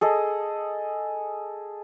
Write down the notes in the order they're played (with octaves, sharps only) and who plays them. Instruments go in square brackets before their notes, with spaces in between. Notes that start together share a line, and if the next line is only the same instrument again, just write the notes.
[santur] G#4 A4 D#5